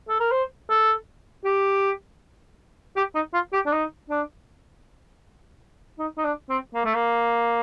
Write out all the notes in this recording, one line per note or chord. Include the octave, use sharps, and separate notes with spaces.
A4
A#4
C5
A4
G4
G4
D#4
F4
G4
D4
D#4
D4
D#4
D#4
D4
C4
A#3
A3
A#3